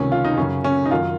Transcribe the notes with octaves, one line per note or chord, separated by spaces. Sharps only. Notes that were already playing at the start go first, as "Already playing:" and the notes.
Already playing: C#2 C3 D#3 C#4
F4
D#4
F#2 C#3 C#4
C#4
D#4
F#2 D#3 F4